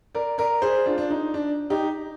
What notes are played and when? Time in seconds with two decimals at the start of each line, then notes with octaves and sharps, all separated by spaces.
0.15 A#4 D5
0.38 A#4 D5
0.62 G#4 C5
0.86 D4 F4
0.98 D4
1.11 D#4
1.34 D4
1.70 D#4 G4